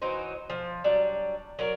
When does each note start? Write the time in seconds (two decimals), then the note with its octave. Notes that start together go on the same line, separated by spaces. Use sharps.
0.02 E3 F#3 D#4 C5
0.50 F3
0.84 F#3 G3 D4
1.59 F#3 A#4 D5